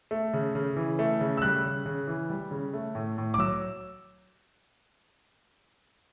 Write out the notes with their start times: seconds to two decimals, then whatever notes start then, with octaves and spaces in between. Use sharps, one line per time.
0.11 A3
0.34 C#3
0.55 C#3
0.76 E3
0.99 A3
1.21 C#3
1.37 E6
1.42 G3 F#6
1.65 C#3
1.86 C#3
2.07 E3
2.30 G3
2.51 C#3
2.74 A3
2.95 A2
3.18 A2
3.34 D6
3.38 F#3 E6